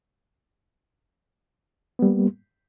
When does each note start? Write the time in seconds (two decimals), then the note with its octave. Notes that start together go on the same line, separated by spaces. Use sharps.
1.99 B3
2.02 G3
2.06 A#3